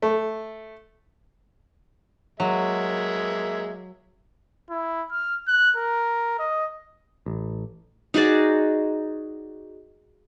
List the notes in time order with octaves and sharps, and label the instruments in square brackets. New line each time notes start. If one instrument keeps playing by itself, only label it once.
[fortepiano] A3
[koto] F#3 [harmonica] G#3 A#3 E5
[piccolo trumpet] E4
F6
F#6
A#4
D#5
[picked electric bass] A1
[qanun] D#4 F#4 G#4 D5